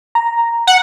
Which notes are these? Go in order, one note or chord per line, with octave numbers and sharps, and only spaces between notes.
A#5
F#5